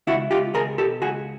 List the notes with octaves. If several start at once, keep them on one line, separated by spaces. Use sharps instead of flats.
C#2 E4 F#4
C#2 F4 G4
C#2 G#4 A#4
B2 G4 A4
C#2 F#4 G#4